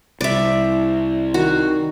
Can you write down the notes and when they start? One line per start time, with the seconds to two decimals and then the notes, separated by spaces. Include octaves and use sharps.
0.21 C2 D5 E5
1.34 D#3 F#4